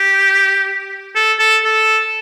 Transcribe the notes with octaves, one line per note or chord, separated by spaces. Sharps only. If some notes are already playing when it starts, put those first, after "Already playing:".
Already playing: G4
A4
A4
A4